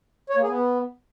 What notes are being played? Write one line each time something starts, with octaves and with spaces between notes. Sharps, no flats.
C#5
A#3
G#4
B3